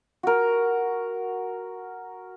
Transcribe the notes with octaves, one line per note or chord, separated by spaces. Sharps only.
F#4 A#4